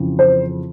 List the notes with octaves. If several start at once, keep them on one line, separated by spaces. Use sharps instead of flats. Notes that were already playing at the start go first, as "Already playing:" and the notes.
Already playing: F2 C#3 E3
C5